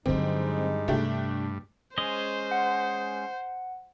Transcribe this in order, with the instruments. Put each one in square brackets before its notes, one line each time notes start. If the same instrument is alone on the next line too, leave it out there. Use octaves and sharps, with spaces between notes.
[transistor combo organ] G2 [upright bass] D3 F#3 [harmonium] G#3 D#4 [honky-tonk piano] C4
[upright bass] C3 [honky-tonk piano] A3 D4 G4
[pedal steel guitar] G#3 C#4 D#5 [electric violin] C5
[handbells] F#5